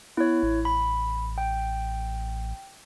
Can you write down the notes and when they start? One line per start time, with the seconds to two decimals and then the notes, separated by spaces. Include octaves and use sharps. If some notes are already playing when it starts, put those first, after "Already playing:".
0.17 B3 E4 C#5
0.43 A1
0.65 B5
1.38 G5